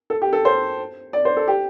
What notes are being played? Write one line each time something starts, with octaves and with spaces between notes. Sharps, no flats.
A4
G4
A4
C5
D5
C5
A4
G4